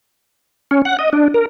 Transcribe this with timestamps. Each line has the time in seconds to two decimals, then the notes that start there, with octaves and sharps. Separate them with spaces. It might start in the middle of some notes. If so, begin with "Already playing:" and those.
0.71 C#4
0.85 F#5
0.99 D#5
1.13 D4
1.34 A#4